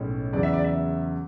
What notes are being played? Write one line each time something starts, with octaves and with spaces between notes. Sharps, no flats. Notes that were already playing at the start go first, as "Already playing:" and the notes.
Already playing: B1 A2 G#3 C#4
E2 C#3 F#3 D5
E5
D5
E5